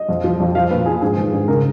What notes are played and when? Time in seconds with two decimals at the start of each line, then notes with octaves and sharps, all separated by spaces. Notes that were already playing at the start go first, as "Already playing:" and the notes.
Already playing: D#5
0.09 F2
0.24 F3
0.40 F2
0.55 F3 F5
0.70 A#2 B4
0.86 F3 G#4
1.02 G#2 G#4
1.17 D#3
1.33 G#2
1.48 C#3 A#4